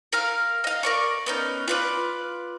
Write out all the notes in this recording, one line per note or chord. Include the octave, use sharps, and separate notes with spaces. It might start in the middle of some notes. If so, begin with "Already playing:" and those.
A#4 F5 F6
D#5 F5
A#4 D5 C#6
B3 C#4 D#4
F4 B4 D5